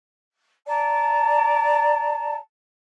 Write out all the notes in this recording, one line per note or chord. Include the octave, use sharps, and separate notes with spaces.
D5 A5 A#5